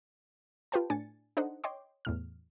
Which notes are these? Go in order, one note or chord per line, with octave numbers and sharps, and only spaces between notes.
F4 G4 B4 C5 G5 A5
A2 D4 G#5 A6 C#7
D4 D#4 A4 C5 D#5 F#5
C#5 D#5 G5 C6 D6
E2 A2 F6